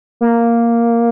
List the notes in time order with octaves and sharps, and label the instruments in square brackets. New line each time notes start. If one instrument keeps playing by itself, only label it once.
[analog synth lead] A#3